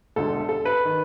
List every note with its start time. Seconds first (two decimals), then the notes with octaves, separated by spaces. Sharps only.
0.16 E1 D2 D3 A4
0.49 A4
0.65 B4
0.85 D#3